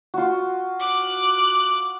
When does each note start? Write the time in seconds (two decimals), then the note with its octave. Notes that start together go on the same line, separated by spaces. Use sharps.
0.14 F4 F#4
0.79 D6 F#6